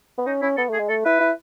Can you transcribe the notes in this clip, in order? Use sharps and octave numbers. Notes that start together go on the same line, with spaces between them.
B3
C#4 D#4
C#4 E4
B3 A4
A3
G#4
G#3
A3 A4
E4 B4
E4